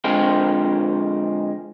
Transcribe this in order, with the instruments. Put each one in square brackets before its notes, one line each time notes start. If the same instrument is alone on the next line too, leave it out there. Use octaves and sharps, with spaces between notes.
[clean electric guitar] D3 F3 G#3 C4 F4